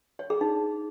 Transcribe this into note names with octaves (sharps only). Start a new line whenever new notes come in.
C#5
G#4
D#4